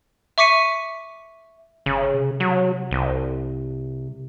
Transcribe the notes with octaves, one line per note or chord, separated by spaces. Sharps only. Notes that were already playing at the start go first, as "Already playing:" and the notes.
E5 C#6 D6 B6 C#7 D#7
G1 C#3
C3
F#3
C2